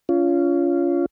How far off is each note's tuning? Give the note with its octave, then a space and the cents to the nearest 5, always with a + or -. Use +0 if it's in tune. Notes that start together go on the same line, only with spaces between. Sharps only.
C#4 +30 F4 -15